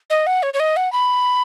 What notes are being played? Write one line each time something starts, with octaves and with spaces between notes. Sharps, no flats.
D#5
F#5
C#5
C#5
D#5
F#5
B5